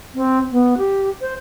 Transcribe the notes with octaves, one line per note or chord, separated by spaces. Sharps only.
C4
B3
G4
C5